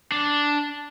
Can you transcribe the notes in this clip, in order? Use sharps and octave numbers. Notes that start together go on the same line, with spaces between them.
D4